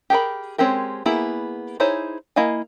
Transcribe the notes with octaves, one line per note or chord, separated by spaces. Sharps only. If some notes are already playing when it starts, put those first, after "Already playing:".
G4 G#4 A#4 B5
G#3 C4 C#4 G4 A#4
A#3 B3 E4 G#4
D#4 E4 G#4 C5 C#5
A#3 E4 D#5 F5 G#5